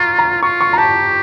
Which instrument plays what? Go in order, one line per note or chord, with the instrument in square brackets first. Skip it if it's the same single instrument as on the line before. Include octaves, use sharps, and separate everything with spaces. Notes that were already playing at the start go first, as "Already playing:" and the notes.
Already playing: [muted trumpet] F4 [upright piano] A#5 C#6
[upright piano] A#5
[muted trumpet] F4 [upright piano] C#6
[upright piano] C#6
A#5
[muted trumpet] G4 [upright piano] A5